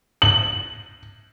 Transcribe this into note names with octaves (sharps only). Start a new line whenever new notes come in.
F#7